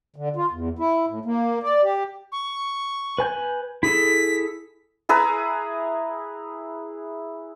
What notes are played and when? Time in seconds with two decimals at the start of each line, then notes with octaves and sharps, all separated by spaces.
0.16 D3
0.36 F4
0.51 E2
0.79 E4
1.08 A2
1.25 A#3
1.63 D5
1.83 G4
2.32 C#6
3.18 B4 G#5 G6
3.83 E4 G#4 A4 B6
5.09 E4 G#4 B4 A#5